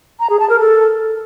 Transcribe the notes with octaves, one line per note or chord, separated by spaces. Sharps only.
A#5
G#4
A5
A#4
A4